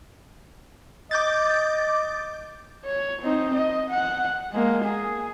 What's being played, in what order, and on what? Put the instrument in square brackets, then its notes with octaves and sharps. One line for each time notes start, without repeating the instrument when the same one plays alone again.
[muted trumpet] D#5 [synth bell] D6 G6 A6
[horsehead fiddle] C#5
C4 D#4
D#5
F#5
G#3 A#3
G#4